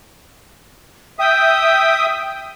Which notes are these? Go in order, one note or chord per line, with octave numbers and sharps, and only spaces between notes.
E5 G5 D#6